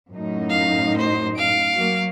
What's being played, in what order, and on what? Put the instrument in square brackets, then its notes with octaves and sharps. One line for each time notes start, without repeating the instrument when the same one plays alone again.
[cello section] F#2 A2 D#4
[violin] F5
C5
F5 D7
[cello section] F#3 A#3